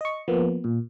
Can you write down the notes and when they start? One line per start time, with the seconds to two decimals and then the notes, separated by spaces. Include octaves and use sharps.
0.01 D#5 C#6
0.28 F3 A#3 B3
0.64 A#2